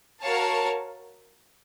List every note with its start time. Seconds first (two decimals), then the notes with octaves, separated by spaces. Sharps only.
0.21 F#4 A#4 C#5 F5 A5